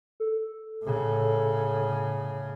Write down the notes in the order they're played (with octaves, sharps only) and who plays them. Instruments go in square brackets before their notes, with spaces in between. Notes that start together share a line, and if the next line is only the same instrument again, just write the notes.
[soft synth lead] A4
[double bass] A2 C#3